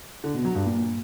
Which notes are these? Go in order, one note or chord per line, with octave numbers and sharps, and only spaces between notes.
D3
B2
F#3
G2
A#2